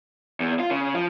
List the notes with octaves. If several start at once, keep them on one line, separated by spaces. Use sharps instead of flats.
E2
F4
C#3
F3